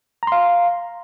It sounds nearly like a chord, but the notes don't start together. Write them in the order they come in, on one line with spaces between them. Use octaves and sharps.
A#5 C6 F5